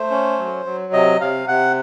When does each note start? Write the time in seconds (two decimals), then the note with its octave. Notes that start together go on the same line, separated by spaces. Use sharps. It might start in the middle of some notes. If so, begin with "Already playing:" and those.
Already playing: A3 C5
0.11 C#4
0.39 F#3
0.65 F#3
0.93 C3 D#5
1.20 C3 F5
1.48 C3 F#5